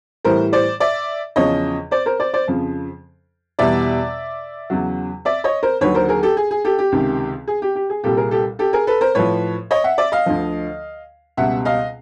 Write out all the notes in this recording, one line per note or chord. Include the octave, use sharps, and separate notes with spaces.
A2 E3 G3 A#4 C5
C5 D5
D5 E5
E2 C#3 F3 C#5 D#5
C5 D5
A#4 C5
C5 D5
C5 D5
F2 C#3 F3
E2 B2 G3 D5 E5
E2 C#3 F#3
D5 E5
C#5 D#5
A#4 C5
D#2 D3 F#3 B4 C#5
A#4 C5
G#4 A#4
G4 A4
G#4
G#4
G4 A4
G4
C#2 C3 D#3
G#4
G4
G4
G#4
C2 A#2 G3 G4 A4
G#4 A#4
G4 A4
G4 A4
G#4 A#4
A4 B4
A#4 C5
A2 F3 B4 C#5
C#5 D#5
E5 F#5
D5 E5
D#5 F5
D2 D3 F3
C#2 B2 G3 E5 F#5
D#5 F5